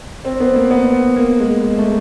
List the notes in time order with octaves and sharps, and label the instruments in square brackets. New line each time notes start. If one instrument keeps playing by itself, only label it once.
[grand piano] C4
B3
A#3
B3
A#3
G#3
G#3
A3